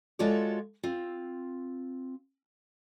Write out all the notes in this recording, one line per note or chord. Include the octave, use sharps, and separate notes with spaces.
G#3 F4 F#4 A4 C#5 D5
C4 F4